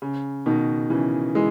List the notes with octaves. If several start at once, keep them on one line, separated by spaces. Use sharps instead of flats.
C#3
B2 D#3
C#3 E3
E3 G#3